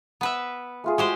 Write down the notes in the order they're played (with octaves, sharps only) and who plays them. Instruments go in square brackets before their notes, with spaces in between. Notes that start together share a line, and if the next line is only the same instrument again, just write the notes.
[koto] B3 B4 E5
[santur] A3 F4 G#4
[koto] G#3 G4 C5 [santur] F#4